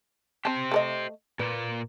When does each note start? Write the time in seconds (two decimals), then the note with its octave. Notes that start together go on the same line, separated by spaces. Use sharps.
0.45 C4 G4 C5 A5
0.71 A3 A4 D#5
1.39 A#2 A#3 B4